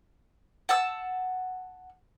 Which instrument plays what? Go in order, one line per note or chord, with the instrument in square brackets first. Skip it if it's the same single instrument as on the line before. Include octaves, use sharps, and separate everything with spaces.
[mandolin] F#5 A5 E6